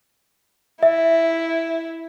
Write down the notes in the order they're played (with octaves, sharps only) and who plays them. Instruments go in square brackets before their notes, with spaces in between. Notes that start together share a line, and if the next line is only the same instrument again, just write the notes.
[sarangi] E4 [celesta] E5